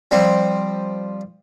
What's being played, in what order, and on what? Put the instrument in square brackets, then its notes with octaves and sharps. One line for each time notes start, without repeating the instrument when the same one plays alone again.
[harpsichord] F3 G3 C4